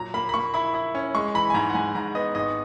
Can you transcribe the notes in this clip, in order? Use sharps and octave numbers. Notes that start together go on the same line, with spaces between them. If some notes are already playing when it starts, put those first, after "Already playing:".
Already playing: A#2 F#3 A#5
A#3 B5
B5
A#3 C#6
E4 B5
E4
C#4
G#3 C#6
E3 B5
G#5
G#2 A#5
F#5
G#2 G#5
G#2 A#5
B3 D#5
G#1 D#5